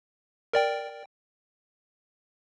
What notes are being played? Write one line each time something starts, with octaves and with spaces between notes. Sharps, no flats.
A#4 D5 G5